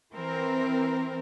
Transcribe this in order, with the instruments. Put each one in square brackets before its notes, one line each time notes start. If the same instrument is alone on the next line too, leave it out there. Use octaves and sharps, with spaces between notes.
[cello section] E3 C4 A#4